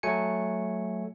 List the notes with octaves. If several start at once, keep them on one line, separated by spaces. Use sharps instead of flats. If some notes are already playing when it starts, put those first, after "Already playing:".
F#3 A3 G#5 C#7